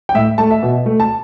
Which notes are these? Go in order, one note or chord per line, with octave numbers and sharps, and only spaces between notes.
G5
A2 E5
A3 A5
E5
B2
A3
A5